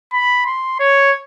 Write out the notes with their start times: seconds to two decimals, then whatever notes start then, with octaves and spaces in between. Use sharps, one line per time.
0.13 B5
0.46 C6
0.80 C#5